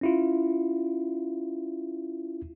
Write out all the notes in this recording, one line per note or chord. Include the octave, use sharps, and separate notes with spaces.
C#4 E4 F4